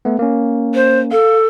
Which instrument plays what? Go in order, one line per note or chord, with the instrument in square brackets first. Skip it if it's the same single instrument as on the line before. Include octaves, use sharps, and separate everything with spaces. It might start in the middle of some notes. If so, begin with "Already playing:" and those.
[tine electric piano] A3 B3
A#3 C#4
[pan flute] C5
[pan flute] A4 [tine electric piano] F5